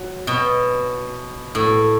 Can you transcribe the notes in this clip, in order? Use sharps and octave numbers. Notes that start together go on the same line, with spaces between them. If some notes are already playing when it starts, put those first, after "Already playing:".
Already playing: F#3
B2
A2